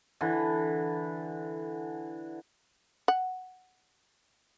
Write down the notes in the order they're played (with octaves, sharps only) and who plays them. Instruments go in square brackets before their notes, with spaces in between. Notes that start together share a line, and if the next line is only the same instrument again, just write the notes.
[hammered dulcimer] D3 E3
[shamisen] F#5